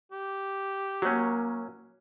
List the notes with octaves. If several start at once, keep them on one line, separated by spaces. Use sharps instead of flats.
G4
F#3 A#3 C#4 F#4 C#5